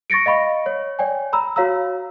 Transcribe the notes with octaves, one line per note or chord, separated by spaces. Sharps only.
C#6 A6 A#6 C#7 D7
D#5 F5 B5 C#6
C#5
C#5 D5 G5 G#5
A#5 B5 E6
F#4 C#5 F5 A#5 E6